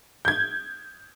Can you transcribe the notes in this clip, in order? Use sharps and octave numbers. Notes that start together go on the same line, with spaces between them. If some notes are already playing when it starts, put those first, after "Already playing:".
G6 G#6